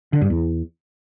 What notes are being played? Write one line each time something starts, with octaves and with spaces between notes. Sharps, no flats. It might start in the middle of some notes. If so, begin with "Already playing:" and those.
D3
G2
E2